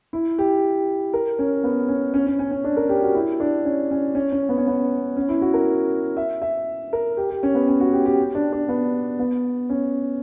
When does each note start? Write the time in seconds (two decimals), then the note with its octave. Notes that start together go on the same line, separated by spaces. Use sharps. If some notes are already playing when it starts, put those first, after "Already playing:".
0.13 E4
0.38 G4
1.14 A#4
1.39 C#4
1.64 B3
1.88 C#4
2.14 C#4
2.26 C#4
2.39 C#4
2.51 C#4
2.64 D4
2.77 A#4
2.89 G4
3.03 F#4
3.15 E4
3.40 D4
3.65 C#4
3.91 C#4
4.15 C#4
4.32 C#4
4.49 B3
4.58 C#4
4.67 B3
5.17 C#4
5.29 E4
5.42 F#4
5.54 A#4
6.17 E5
6.42 E5
6.93 A#4
7.17 G4
7.30 G4
7.43 C#4
7.55 B3
7.68 C#4
7.80 F#4
7.93 G4
8.05 G4
8.35 D4
8.52 D4
8.69 B3
9.19 B3
9.70 C#4